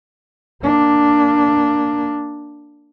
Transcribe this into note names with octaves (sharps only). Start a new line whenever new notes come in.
A#3 D4